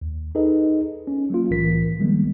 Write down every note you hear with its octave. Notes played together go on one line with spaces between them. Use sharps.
D#2
D#4 G#4 A4 B4 D#5
C#4
F#3 A#3 F4
C2 A2 E3 A#4 B6
D#3 F3 G3 G#3 A#3 B3